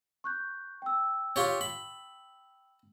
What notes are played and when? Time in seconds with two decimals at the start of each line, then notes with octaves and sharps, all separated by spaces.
0.24 C#6 F#6 G6
0.82 G5 E6
1.36 F4 G4 C#5
1.61 B5